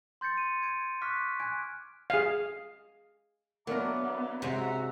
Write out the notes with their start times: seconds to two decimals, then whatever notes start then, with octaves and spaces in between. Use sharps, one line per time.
0.21 C6 G6 A6 C#7
0.37 D#7
0.62 G#6 D7
1.01 C#6 D6 F6 F#6 B6
1.16 F#6
1.40 G#5 F#6 G#6 D7
2.10 G#4 F5
3.67 F#3 A#3 B3 D4 A#4 E5 A#5 D6
4.42 C3 G#3 F#4 E5 A#5